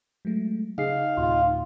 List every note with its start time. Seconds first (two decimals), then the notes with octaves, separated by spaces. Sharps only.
0.25 F#3 G#3 A3
0.78 C#3 D#4 G#4 F5 C7
1.17 D2 A2 C3 F4